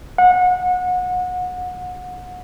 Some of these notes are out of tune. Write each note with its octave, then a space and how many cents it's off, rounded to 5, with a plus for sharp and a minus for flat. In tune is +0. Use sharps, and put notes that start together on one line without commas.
F#5 -30